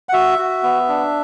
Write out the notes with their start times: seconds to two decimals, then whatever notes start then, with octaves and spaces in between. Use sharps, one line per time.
0.09 F#5
0.13 F#4 E5
0.39 F#4
0.63 B3
0.88 D4